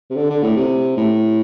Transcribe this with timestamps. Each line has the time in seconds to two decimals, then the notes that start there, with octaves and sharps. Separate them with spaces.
0.10 C3
0.16 D3
0.30 D3
0.43 A2
0.57 C3
0.97 A2